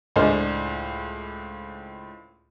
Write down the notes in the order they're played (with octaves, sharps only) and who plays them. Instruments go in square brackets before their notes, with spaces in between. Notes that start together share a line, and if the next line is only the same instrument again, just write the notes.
[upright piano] C#2 A2 D4 G#4 C5 F6